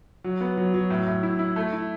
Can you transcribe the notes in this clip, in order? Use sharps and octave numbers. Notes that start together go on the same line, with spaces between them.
F#3
B3
F#3
F#3
A2
A2
E4
E4
A3
E4